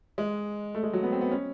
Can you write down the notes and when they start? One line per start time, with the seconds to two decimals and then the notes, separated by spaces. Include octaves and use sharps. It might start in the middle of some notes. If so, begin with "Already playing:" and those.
0.18 G#3
0.75 A3
0.83 G#3
0.93 F#3
1.03 B3
1.12 C4
1.21 B3
1.31 C#4